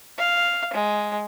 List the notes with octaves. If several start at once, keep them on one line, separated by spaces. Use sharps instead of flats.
F5
G#3